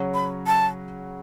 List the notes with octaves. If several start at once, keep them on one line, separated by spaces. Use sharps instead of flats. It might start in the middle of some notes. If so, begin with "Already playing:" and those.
Already playing: C#3 F#3 C#4 F#4
B5
A5